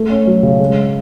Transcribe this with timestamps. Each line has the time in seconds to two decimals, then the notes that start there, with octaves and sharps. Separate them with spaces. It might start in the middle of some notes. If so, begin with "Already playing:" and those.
Already playing: A3
0.10 C#4
0.27 F#3
0.43 C#3
0.60 G#3